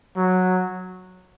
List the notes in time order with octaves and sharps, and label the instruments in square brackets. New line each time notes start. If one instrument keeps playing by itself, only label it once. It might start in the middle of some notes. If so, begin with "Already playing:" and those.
[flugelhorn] F#3